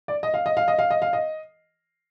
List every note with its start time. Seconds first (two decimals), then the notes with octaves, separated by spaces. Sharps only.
0.08 D5
0.23 D#5
0.34 F5
0.46 D#5
0.57 F5
0.68 D#5
0.79 F5
0.91 D#5
1.02 F5
1.13 D#5